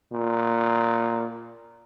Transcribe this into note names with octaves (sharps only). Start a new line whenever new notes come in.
A#2